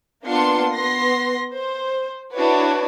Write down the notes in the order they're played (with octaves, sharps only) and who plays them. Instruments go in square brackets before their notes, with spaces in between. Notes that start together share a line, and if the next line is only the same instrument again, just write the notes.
[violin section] A#3 B3 D4 F4 C6 C#7
B3 C6 A#6 C7
C5
D4 E4 F#4 B4 C#5 D5